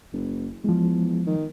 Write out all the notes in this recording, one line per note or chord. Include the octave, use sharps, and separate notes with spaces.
F#1
E2 F3 G#3
D#3